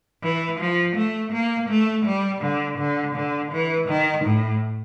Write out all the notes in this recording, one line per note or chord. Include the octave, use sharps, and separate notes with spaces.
E3
F3
A3
A#3
A3
G3
D3
D3
D3
E3
D#3
A2